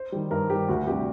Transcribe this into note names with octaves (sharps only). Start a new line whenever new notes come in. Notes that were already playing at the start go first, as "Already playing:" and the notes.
Already playing: C5
D#3 G3
G2 A#4
D#3 G3 G4
D2 F#4
C3 G3 D4 G4